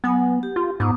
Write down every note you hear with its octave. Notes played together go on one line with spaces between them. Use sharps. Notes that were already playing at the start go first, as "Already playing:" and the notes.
F#3 B3 F#5 G#5
G4
F4
G#2 B3 D6 D#6